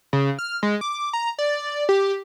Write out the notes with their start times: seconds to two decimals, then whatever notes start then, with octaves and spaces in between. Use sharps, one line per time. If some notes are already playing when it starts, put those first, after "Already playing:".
0.13 C#3
0.39 F6
0.63 G#3
0.81 D6
1.13 A#5
1.39 D5
1.89 G4